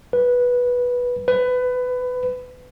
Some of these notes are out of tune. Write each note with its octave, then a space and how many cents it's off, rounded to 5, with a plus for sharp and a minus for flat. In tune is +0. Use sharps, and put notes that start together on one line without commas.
B4 -10
B4 +20